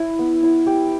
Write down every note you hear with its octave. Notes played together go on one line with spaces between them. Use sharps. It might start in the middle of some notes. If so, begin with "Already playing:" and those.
Already playing: E4
B3
E4
G4